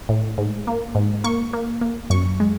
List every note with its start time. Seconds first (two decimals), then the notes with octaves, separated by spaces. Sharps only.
0.09 A2
0.38 G#2
0.67 A#3
0.95 G#2
1.24 A#3 C#6
1.53 A#3
1.81 A#3
2.10 F#2 C#6
2.40 G#3